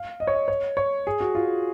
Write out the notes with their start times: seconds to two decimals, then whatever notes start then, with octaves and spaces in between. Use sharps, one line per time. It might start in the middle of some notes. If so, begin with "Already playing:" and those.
Already playing: F5
0.20 D#5
0.27 C#5
0.34 D#5
0.48 C#5
0.77 C#5
1.07 G#4
1.20 F#4
1.35 F4